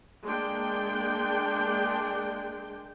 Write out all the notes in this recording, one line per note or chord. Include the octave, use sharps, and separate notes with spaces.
G#3 A#3 D4 G5